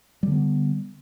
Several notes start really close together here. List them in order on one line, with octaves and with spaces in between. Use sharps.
G3 D3 B3